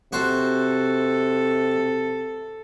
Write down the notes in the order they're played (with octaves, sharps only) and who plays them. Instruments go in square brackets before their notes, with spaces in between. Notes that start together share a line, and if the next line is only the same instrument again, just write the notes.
[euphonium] C3 [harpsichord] F#4 C5 [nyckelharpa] A4